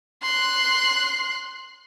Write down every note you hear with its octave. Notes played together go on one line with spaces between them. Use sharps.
C6 F#6